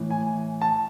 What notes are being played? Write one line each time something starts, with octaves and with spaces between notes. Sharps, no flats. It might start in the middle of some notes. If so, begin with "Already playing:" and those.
Already playing: A2 E3
G#5
A5